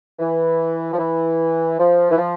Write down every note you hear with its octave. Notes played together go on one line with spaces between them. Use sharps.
E3
F3
E3
F3
E3
F3